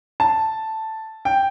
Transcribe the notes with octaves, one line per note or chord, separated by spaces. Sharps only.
A5
G5